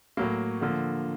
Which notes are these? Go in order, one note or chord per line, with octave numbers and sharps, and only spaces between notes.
A2 F#3 A#3
D3 F3 A#3